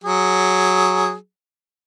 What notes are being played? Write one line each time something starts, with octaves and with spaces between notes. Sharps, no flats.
F#3 G#4